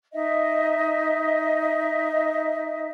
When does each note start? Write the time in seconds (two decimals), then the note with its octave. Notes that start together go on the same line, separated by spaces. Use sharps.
0.14 D#4 D#5 E5